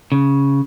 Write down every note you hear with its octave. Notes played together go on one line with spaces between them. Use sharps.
C#3